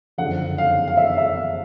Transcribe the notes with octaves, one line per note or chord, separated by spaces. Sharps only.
F#1 F2 D3 F#5
F5
F5
E5
E5